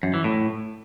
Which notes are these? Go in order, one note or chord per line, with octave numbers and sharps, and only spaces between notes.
F#2
E3
A2